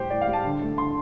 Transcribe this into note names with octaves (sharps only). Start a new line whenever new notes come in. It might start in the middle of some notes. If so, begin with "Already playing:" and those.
Already playing: A2 G3 G4 C5
A2 D5
F5
G3
A5
D3
A3
D3 C6